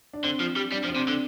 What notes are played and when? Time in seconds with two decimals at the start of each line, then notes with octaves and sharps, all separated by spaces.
0.13 D4
0.24 D3 C4
0.40 F3
0.56 G3
0.72 G3 D4
0.84 F3
0.88 C4
0.96 C3
1.05 D4
1.08 D3